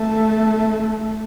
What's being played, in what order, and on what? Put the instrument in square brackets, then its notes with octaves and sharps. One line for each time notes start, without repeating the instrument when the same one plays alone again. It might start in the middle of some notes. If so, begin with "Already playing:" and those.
Already playing: [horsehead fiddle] A3